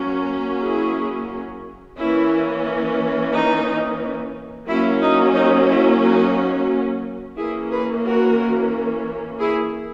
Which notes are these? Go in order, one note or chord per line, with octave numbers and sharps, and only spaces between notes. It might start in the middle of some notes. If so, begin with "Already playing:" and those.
Already playing: F#3 A#3 C#4
E4 G#4
E3 A#3 C#4 E4
D#4
F#3 A#3 C#4 E4
D#4
D#4
E4
D#4 F#4
E3 A#3 C#4 E4 G#4
G#4 B4
F#4 A#4
E4 G#4